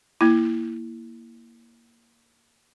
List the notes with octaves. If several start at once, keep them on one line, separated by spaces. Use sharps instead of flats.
A#3 E4